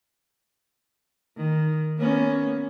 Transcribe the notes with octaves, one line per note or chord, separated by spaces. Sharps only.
D#3
A#3 B3 C#4